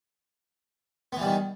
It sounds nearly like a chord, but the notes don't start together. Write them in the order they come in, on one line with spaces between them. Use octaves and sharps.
B3 E3 G3 D#3